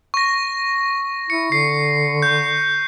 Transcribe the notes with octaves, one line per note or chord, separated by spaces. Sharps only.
C#6 A#6
E4 C#7
D3 C7
G6